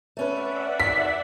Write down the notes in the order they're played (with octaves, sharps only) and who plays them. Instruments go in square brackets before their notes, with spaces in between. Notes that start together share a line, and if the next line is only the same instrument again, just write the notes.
[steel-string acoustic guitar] A3 C#4 B4 [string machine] D5 E5 F#5
[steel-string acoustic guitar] D2 D#3 [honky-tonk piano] B6